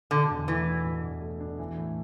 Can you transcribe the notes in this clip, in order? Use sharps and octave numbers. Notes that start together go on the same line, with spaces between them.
B2 D3
E2
E3 A3
D4
B2
E2
A3
D4
E3
A2